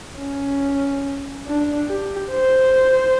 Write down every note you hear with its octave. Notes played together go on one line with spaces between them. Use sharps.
C#4
D4
G4
C5